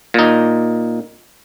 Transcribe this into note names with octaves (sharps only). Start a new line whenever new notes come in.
A#2 D#4